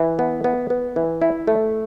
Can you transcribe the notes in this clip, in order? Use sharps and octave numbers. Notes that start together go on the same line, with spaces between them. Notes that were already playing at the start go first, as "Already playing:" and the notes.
Already playing: E3
B3
B3
B3
E3
E4
A3